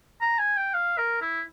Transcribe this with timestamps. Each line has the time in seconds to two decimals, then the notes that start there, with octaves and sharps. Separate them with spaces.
0.21 A#5
0.39 G#5
0.57 G5
0.74 F5
0.98 A#4
1.22 E4